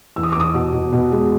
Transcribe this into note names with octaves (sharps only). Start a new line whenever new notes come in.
E2 E6
D#6
E2 D6
D#6
B2
B2
B2
G#3